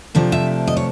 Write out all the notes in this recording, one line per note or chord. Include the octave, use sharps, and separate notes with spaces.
C3 F3 A3 D4
E5
D#5
C#5